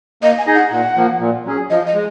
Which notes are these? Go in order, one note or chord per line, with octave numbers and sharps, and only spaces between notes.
A#3 D#5
G#5
D#4 G#4 D#5
F#5
A#2 F#5
F3 A#3
A#2
F#3 C#4 G#4
F3 D#5
D#5
G#3